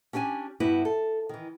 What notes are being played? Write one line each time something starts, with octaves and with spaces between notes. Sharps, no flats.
C#4 D4 G4 G5 G#5
G2 B3 E4 F#4 B4
A4
D#3 E3